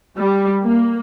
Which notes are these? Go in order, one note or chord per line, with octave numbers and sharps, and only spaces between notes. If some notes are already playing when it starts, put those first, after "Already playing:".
G3
A#3